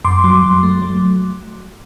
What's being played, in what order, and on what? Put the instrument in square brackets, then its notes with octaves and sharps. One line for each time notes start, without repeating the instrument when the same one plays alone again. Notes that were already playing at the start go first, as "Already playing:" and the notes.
[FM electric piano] F#2 C6 D6
F#3
F#3
A3
F#3